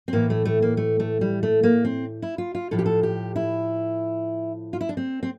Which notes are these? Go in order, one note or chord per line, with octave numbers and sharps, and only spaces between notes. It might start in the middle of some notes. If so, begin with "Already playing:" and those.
C4
A2 E3 A#3
A3
A3
A#3
A3
A3
G3
A3
A#3
C4
E4
F4
F4
A2 F3 A4
G4
A4
G4
E4
F4
E4
D4
C4
C4